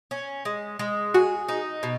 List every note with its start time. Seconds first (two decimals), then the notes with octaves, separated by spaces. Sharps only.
0.11 C#4
0.45 G#3
0.79 G#3
1.14 F#4 G#4
1.49 D#4
1.83 B2